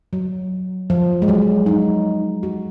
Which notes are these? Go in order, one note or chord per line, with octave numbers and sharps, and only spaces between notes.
F#3
F3
G#3
F#3
D#4
F#4